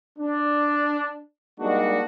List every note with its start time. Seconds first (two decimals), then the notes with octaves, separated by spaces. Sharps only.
0.18 D4
1.60 G3 G#3 A#3 D4 D#4 F#4